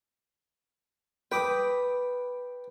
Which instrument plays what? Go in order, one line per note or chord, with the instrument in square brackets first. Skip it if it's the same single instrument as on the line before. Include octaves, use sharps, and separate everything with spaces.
[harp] B4 [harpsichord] G5 D6 D#6